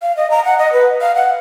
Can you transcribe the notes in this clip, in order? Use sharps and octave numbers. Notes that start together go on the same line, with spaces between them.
F5
D#5
A#5
F#5
D#5
B4
F5
F#5